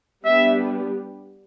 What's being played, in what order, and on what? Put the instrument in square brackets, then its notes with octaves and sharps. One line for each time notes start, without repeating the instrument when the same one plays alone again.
[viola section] G3 B3 D4 G4 [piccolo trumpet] E5